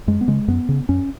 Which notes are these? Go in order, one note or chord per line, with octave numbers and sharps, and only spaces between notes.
F#2 G#3
B3
C#3 G#3
F#2 B3
C#3
F#2 C#4